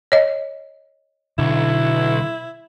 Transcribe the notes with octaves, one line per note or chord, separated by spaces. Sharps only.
C#5 D#5
B1 D3 E4